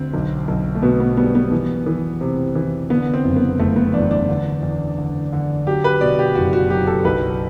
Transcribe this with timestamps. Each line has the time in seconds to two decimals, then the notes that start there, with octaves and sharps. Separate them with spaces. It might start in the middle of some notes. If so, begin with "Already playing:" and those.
Already playing: D2 C4
0.14 B1
0.48 B1
0.75 A3
0.82 B2 B3
1.00 B3
1.17 G3 B3
1.35 B3
1.52 E3
1.86 E3
2.21 C3
2.55 E3
2.90 D3 B3
3.14 C4
3.24 F#1
3.36 B3
3.59 F#1 A3
3.76 B3
3.94 E2 D4
4.11 D4
4.29 D3
4.63 E2
4.98 D3
5.33 D3
5.67 F#3 G4
5.84 B4
6.01 B2 D5
6.19 G4
6.35 F#1 F#4
6.53 F#4
6.70 F#3 G4
6.87 A4
7.05 B1 B4